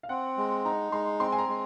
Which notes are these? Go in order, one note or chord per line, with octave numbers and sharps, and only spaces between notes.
F5
C4 F#5
G#3
D#4 A#5
G#3 C6
C4 C6
G#5
A#5
G#3